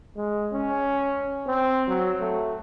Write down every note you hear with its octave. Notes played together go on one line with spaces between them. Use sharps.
G#3
C#4
C4
F#3
A3